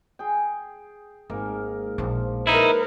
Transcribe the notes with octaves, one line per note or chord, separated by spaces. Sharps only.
G#4 G5
G#1 G#2 A#3 A#4
A#1 B2 F3
D#4 E4 A#4 B4